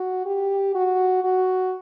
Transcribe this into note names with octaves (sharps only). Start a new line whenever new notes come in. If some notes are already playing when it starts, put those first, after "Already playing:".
Already playing: F#4
G4
F#4
F#4